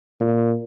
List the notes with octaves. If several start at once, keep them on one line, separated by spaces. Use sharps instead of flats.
A#2